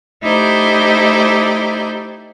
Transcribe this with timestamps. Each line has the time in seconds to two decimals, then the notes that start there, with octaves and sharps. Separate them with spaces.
0.23 A3 D#4 E4 G4 C5 D5